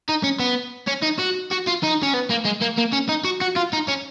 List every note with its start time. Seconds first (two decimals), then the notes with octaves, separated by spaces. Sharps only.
0.09 D#4
0.23 C#4
0.40 B3
0.88 C#4
1.03 D#4
1.19 F#4
1.51 F#4
1.67 F4
1.83 D#4
2.03 C#4
2.14 B3
2.31 A#3
2.45 G#3
2.62 A#3
2.78 A#3
2.93 C#4
3.09 D#4
3.24 F#4
3.41 F#4
3.56 F4
3.73 D#4
3.88 C#4